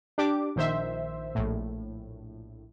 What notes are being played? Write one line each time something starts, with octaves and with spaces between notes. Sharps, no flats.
D4 G4 D6
A#1 D#3 C5 E5
A#1 A2